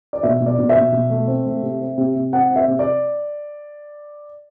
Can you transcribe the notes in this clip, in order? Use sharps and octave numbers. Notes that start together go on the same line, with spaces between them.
D5
B2 E5
B2
D5
B2
E5
B2
B2
A3
C4
A3
C3
C4
C3
C3
C4 F#5
C4
E5
C3
D5